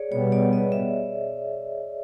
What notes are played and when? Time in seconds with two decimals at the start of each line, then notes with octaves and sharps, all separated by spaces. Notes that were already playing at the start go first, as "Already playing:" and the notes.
Already playing: G#4 C#5 D5
0.12 B2 G3 B3 C#5
0.32 D5
0.53 D#5
0.72 E5